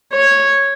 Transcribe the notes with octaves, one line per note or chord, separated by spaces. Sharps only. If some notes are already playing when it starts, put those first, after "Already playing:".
C#5